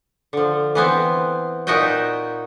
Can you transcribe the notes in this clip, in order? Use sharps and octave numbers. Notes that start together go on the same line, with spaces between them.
D3 F3
E3 B3 C4
A#2 D#4 F#4 D#5 E5 G5